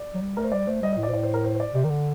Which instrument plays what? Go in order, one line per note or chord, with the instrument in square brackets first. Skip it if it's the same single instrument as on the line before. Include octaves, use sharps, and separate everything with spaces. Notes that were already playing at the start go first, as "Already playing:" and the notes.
Already playing: [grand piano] D5
[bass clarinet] F#3
G3
[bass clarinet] A3 [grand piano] A#4
[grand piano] C5
[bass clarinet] G3 [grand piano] D5
[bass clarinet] A3 [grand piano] C5
[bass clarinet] G3 [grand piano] D#5
[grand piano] D#5
[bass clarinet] A2
[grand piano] D5
[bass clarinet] A#2 [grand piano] C5
[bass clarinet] A2 [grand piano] D5
[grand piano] C5
A#4
C5
C5
D5
[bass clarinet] C3 [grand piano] D5
[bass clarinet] D#3
D3